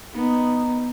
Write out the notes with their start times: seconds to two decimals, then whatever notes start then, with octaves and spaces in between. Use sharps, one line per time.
0.13 B3 D#4